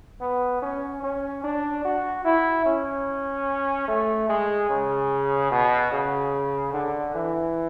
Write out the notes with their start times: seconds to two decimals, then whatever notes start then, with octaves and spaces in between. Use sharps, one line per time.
0.21 B3
0.62 C#4
1.03 C#4
1.44 D4
1.84 F#4
2.25 E4
2.66 C#4
3.88 A3
4.29 G#3
4.69 C#3
5.51 B2
5.92 C#3
6.74 D3
7.15 E3